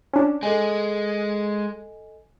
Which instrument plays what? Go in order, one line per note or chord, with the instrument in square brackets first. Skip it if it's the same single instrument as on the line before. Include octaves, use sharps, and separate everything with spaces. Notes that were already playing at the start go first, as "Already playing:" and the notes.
[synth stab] C#4 D4
[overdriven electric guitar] G#3 [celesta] A4 D#5 G#5